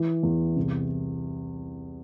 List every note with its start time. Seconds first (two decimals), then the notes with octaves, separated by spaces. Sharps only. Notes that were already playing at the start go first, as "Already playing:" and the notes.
Already playing: E3
0.23 E2
0.56 C2